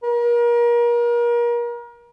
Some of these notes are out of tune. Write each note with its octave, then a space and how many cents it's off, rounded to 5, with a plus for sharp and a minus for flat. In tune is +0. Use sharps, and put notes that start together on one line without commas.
A#4 +35